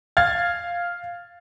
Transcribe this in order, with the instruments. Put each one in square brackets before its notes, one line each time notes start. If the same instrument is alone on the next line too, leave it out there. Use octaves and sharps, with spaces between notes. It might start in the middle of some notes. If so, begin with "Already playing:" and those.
[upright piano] F5 F6 G#6 A6